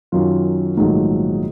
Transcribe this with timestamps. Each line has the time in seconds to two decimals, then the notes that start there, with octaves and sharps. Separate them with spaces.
0.12 F#2 D#3 F#3 F4
0.77 A#1 G#2 D#3 F#3 A3